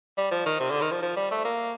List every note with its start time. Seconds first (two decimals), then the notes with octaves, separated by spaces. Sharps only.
0.18 G3
0.31 F3
0.46 D#3
0.60 C3
0.71 D3
0.81 D#3
0.92 F3
1.02 F3
1.16 G3
1.31 A3
1.45 A#3